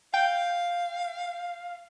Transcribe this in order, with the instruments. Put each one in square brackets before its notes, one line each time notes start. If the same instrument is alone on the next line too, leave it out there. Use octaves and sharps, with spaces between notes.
[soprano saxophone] F5 [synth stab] G5